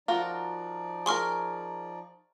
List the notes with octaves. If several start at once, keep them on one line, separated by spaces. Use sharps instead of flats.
F3 D#4 F4 F#4 A#4 D5
G#4 A#4 C6 C#6 F6